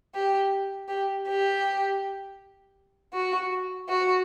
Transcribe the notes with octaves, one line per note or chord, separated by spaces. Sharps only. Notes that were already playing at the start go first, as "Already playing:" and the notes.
G4
G4
G4
F#4
F#4